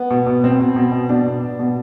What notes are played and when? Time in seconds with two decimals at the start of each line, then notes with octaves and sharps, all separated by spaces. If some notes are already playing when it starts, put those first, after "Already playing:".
Already playing: B3
0.10 B2
0.26 B2
0.44 B2 C4
0.60 B2
0.76 B2
0.92 B2
1.09 B2 D4
1.26 B2
1.42 B2
1.59 B2